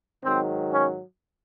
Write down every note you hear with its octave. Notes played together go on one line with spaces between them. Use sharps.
G#2 D#3 F#3 C4
C#4